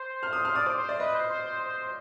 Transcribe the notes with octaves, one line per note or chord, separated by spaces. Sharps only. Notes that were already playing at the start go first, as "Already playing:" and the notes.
Already playing: C5
F6
D#6
F6
D5 D#6
C5 D6
C5
D5
B4 D#5
C5
C5
C5
C5